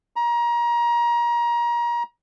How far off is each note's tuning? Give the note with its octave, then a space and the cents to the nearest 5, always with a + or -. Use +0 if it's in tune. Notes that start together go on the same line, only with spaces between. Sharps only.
A#5 +30